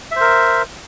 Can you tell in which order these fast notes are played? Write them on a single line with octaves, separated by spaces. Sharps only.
E5 C5 A#4